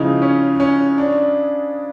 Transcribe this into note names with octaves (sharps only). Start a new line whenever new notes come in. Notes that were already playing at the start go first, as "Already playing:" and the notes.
Already playing: C#3 F3 G#3 D#4 E4
C#4
C#4
D4